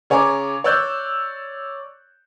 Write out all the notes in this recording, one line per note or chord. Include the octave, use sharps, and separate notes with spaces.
C#3 C#5 G#5 A#5 D6
C#5 D5 E6 F#6 G6